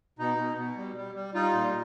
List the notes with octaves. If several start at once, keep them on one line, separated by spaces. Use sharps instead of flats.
B2 D#4
B2
B2
G3
G3
G3
G3 D#4 F4
A#2